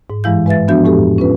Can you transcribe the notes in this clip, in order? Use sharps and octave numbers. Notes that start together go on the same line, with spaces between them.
G#2
G2 E3 G#3 E4 F5 G6
G#3 B4 E5 A6
F3 B3 D4 F#4 E5 G6
F2 A2 G#3 G4 A4
C#4 F4 B4